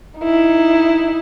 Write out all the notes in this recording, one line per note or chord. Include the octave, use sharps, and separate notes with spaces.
D#4 E4